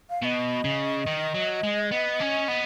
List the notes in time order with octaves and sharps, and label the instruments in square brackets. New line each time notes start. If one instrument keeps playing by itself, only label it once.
[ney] F5
[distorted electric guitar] B2 [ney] D#5 F5
[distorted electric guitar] C#3
D#3
F#3
G#3
B3
C#4
B3